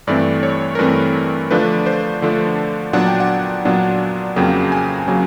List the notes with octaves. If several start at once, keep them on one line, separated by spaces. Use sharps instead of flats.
G2 E3 A3 C4 D5
C#5
A#4
G2 E3 A3 C4 B4
D3 F3 A3 D4 B4
C5
D3 F3 A3 D4
A#2 F#3 B3 D4 F#5
G5
F#5
A#2 F#3 B3 D4
F2 C#3 F#3 A#3 G5
G#5
C#3 F#3 A#3